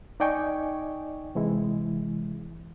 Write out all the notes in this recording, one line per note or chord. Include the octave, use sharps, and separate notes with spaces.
D#4 D5 D#5 G5 G#5 C#6
C3 E3 G#3 E4